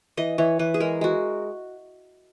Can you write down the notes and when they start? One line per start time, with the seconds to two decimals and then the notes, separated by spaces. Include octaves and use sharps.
0.17 E3 D#5
0.38 E3 C#5
0.59 E3 B4
0.74 G#4
0.80 G#3 A#4
1.01 G#3 F#4